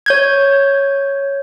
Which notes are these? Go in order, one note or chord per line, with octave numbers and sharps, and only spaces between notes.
C#5 G6 G#6